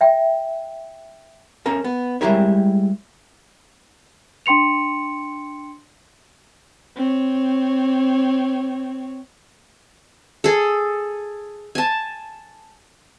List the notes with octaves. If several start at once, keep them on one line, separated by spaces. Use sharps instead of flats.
E5 G5
C#4 A4 A#4 A5
B3
G3 G#3 E4 G4 A#4 C#5
D4 G5 C6 C#7 F7
C4 C#5
G#4 A4
G#5 A5